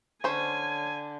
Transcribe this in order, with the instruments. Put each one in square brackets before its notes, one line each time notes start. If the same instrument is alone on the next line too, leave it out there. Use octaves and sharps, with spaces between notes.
[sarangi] D3 [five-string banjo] C#4 C5 [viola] G#5